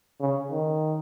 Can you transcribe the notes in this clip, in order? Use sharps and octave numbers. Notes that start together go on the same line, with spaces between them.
C#3
D#3